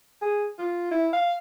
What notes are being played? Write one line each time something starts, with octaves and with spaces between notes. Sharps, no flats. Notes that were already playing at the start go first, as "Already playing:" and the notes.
G#4
F4
E4
F5